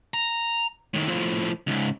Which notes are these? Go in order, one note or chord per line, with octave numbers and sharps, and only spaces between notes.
A#5
A2 D#3
A2 F3
C#2 G#2